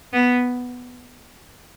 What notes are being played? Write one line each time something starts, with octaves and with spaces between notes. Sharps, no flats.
B3